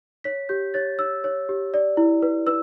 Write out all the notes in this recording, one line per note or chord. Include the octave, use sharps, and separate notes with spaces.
C#5 B6
G4 G6
C#5 A6
C#5 E6
C#5
G4
D5
E4
B4
B4 E6